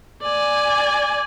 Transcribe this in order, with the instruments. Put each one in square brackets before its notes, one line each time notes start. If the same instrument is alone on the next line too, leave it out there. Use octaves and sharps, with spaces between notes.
[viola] D5 G#5